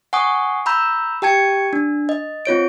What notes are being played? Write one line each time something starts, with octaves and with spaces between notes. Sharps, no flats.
F#5 G#5 C#6 D#6
A#5 B5 E6 G6
G4 G5 A5 G#6 C#7
D4
D#5
C4 F4 C#5 D7